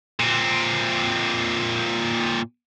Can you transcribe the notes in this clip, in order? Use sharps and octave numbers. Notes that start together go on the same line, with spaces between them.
A#2 C4